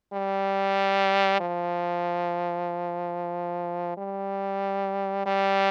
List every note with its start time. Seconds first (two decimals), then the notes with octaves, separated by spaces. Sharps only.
0.12 G3
1.40 F3
3.97 G3
5.26 G3